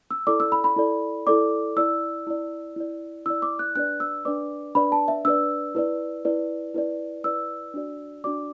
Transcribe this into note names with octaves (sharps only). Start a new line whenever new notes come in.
E6
E4 A4 D5 D6
E6
B5
B5
E4 A4 D5
E4 A4 D5 D6
E4 D5 E6
E4 D5
E4 D5
E4 D5 E6
D6
F#6
D4 B4 D5 F#6
E6
D4 B4 D5 D6
D4 B4 D5 B5
A5
E5
D4 B4 D5 E6
E4 B4 D5
E4 B4 D5
E4 B4 D5
E4 B4 D5 E6
D4 F#4 D5
D4 F#4 D5 D6